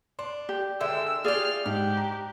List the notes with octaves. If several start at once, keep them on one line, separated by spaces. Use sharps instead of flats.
D4 C6
G4
D3 D#3 G#3 E5 G5 E6
F4 G4 G#4 D5 F6
G#2 D4 G4
A#5